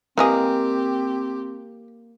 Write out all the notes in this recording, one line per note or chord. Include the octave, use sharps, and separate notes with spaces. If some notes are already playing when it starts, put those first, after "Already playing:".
E3 G#3 A#3 C4 G4 G#4